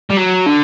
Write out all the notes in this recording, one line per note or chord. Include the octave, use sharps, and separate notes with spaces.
G3
F#3
D3